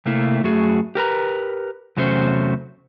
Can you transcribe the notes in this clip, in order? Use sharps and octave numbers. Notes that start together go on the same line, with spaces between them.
C3 A3 A#3 E4
F#2 A3 F#4 G#4
G4 A#4 B4 A#5
E2 C3 F#3 A3 C#4 C5